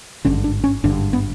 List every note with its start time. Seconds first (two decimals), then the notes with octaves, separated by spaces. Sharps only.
0.25 G#1 G2 D3 C#4
0.44 D4
0.64 C#4
0.84 G#1 G2 D3 D4
1.13 B3